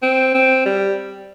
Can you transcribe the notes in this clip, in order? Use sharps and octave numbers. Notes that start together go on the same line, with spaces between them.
C4
C4
G3